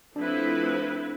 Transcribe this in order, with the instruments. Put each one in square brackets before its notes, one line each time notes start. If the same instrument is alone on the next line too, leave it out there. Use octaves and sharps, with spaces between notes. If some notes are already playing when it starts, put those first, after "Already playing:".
[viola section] F3 A3 C4 E4 B4 [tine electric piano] D4